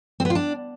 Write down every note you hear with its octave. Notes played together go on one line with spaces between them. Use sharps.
C4
B3
F4
D4